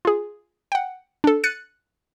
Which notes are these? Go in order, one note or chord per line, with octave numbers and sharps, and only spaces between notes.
F4 G#4
F#5 G5
D4 A4
F#6 A6 C#7 D#7